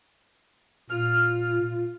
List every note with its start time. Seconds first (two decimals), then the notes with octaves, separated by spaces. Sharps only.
0.90 A#2 F4 F6